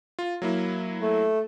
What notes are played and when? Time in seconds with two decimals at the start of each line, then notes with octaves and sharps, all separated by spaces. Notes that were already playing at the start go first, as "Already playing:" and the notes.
0.19 F4
0.42 F#3 A#3 E4
1.00 A3